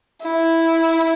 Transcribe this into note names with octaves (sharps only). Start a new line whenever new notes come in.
E4